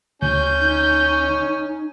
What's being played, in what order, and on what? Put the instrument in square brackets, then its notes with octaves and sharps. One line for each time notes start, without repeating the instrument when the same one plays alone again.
[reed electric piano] D2 [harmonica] C#4 [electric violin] G6
[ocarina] D#4